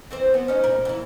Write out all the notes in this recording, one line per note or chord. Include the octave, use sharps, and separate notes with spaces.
E3 C4 C5
B3
C#4 D#4
A#2 A#4
E3 E4